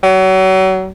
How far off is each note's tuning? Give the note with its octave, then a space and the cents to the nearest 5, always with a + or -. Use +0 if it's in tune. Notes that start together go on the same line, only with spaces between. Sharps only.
F#3 +35